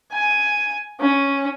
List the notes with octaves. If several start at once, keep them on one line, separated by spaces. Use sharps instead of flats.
G#5
C#4